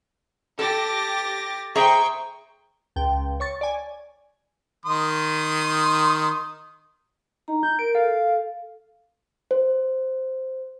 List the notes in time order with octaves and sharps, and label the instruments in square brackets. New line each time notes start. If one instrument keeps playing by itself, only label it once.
[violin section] G4 A6 A#6 [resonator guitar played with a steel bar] A4
[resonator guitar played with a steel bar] G#4 E5 A#5 [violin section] C5 G5 C#6
[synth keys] C#2 G5
C#5 C#6 A6
D5 G#5
[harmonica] D#3 C6 D#6
[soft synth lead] D#4 [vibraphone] A#5
[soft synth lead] G6
[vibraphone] A#4 [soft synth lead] D7
[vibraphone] A4 [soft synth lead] F5
[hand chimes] C5